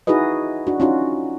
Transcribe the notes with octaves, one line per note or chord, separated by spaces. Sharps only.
D#4 E4 F#4 G#4 B4 D#5
D4 F#4
C#4 D#4 F4 F#4